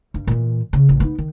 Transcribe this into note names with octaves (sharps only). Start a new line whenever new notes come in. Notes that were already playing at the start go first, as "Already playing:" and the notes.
G2
A#2 E3
C#3
A1
B3 D#4
D#3